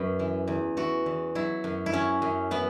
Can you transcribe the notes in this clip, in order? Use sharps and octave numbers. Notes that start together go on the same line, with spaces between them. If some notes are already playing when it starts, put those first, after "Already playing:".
Already playing: F#2 B4
E3
E2
E3 F#4
E2
F#3 E4
F#2
E4
F#3 C#4
F#2
E3 B3